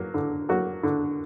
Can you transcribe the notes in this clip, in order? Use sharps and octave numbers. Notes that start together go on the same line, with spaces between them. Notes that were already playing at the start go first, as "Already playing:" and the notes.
Already playing: F#3 A#3
D3
F#3 A#3 F#4
D3